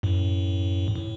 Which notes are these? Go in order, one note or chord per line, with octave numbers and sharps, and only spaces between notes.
F#2 A2
A2